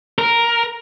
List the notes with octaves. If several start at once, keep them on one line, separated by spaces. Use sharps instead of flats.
A#4